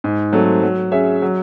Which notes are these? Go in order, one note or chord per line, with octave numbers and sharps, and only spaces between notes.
G#2
F#3 A3 C4
F#3
C#4 G#4 C#5 E5
F#3